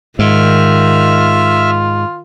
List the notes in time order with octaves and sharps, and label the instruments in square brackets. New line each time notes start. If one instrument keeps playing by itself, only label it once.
[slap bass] G#2 [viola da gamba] D#3 [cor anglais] F4 [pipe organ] E5 F6